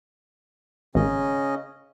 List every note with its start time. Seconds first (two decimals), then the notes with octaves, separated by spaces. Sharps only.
0.95 G#1 C#3 C#4 D#5